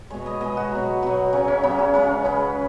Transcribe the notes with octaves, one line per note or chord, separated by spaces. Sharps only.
B2 G#3 C#5
D#5
B2 G#3 D#5
F#4
B2 F#3
B2 F#3 F#4
C#3 F#3 C#4
C#4
C#3 F#3 B3
C#4
C#3 G#3 C#4
C#3 G#3 B4